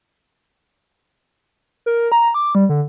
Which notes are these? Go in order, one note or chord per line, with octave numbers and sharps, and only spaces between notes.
A#4
A#5
D6
G3
D3